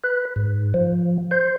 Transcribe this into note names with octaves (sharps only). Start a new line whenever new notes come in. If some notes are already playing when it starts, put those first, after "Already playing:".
B4
G#2
F3
C5